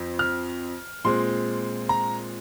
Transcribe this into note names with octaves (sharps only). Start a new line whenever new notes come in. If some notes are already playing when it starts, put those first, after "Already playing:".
Already playing: F2 F3 C4
F6
A#2 G#3 C4 C6
A#5